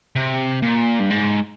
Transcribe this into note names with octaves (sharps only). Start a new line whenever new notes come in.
C3
A#2
G2
G#2